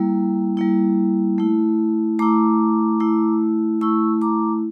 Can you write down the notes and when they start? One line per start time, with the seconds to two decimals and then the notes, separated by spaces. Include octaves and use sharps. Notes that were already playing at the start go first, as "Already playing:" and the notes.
Already playing: G3 A#3 E4
0.57 G3 A#3 E4
1.38 A3 E4
2.19 A3 E4 A#5 D6
3.00 A3 E4
3.81 A3 E4 C#6 E6
4.21 A#5 D6